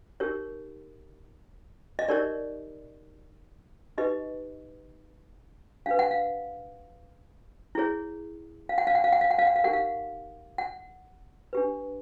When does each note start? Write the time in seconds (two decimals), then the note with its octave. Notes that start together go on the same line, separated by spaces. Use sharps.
0.20 D#4 G4 A#4 C#5
1.99 D#5
2.08 D#4 G4 A#4 C#5 D5
3.98 D#4 G4 B4 D#5
5.86 D4 G4 B4 F5
5.99 F#5
6.11 F5
7.75 E4 G#4 C#5
8.69 F5
8.78 F#5
8.87 F5
8.95 F#5
9.04 F5
9.13 F#5
9.21 F5
9.31 F#5
9.39 F5
9.47 F#5
9.56 F5
9.64 D#4 G4 A#4 F#5
9.73 F5
10.58 F#5
11.53 D4 G4 B4